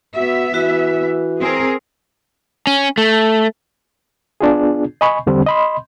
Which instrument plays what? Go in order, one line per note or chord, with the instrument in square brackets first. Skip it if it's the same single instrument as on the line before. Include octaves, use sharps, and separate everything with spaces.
[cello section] B3 E5 [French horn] F#4
[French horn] E3 [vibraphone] F#4
[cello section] C4 G#4 A#4
[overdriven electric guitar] C#4
A3
[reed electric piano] B3 D4 F4 G#4
D#5 G#5 B5 C#6
E2 D3 G3 C4 D4
D#5 B5 C6